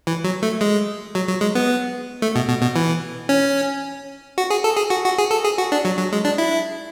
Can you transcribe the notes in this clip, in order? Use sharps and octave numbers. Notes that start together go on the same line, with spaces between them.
E3
F#3
A3
G#3
F#3
F#3
G#3
B3
A3
B2
B2
B2
E3
C#4
F#4
G#4
A4
G#4
F#4
F#4
G#4
A4
G#4
F#4
D4
F#3
F#3
G#3
D4
E4